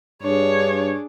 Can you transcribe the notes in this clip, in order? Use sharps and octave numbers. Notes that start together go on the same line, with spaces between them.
G2 D4 G#4 C#5